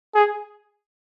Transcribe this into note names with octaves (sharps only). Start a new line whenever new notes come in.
G#4